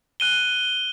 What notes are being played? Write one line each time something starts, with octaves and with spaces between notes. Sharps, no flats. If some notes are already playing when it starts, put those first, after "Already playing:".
F#6 D#7 G7